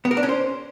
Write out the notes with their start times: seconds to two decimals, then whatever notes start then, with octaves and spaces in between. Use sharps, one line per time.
0.05 B3
0.11 A#4
0.17 D4
0.23 C#4
0.29 C5